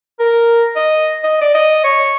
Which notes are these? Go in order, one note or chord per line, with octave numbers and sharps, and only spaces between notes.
A#4
D#5
D#5
D5
D#5
C#5